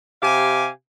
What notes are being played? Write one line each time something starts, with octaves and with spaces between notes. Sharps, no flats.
C3 G4 F5 G#5